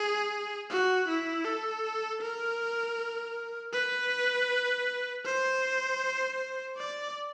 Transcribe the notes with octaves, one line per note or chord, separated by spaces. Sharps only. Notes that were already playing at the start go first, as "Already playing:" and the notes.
Already playing: G#4
F#4
E4
A4
A#4
B4
C5
D5